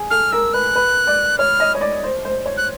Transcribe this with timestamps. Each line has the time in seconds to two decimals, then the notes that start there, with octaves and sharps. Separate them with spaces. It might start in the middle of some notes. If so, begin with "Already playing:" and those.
Already playing: G#4
0.11 A4 F6
0.32 A#4 E6
0.53 B4 F#6
0.75 B4
1.07 D5
1.38 C#5 F6
1.60 D#5
1.75 C#5
1.81 D5
2.04 C5
2.25 C5
2.46 C#5
2.57 F#6